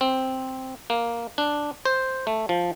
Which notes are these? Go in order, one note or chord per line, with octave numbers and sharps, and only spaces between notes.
C4
A#3
D4
C5
A3
F3